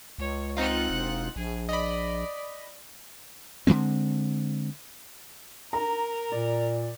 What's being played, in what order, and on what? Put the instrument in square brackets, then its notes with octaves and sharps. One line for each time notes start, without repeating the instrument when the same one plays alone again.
[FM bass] C#2 [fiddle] C#5
[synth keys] C4 D#4 F4 [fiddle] F#5 F#6
[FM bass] E1
[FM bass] A#1 [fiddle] G#4
[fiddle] D5 [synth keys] D#5 B5
[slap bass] D3 E3 G#3 C4
[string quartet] A#4 [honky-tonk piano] A#5
[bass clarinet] A#2 [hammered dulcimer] D5